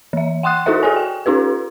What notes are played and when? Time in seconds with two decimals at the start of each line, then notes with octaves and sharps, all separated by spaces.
0.13 E3 E5
0.43 F#5 G5 C6 D#6 F#6
0.66 D#4 E4 F#4 A4 C5 E5
0.83 F#4 G#4 A4 C#5 G#5
0.96 G5
1.26 C#4 D#4 F4 G4 B4